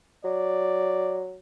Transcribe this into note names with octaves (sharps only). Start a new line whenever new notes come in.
F#3 D5